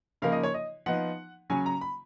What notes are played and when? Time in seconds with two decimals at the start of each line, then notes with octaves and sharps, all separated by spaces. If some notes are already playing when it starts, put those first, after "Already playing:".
0.22 C#3 F3 A#3 D#4 F5
0.32 D#5
0.43 C#5
0.54 D#5
0.86 F3 B3 D#4 F#5
1.50 C#3 F#3 C#4 G#5
1.66 A#5
1.81 B5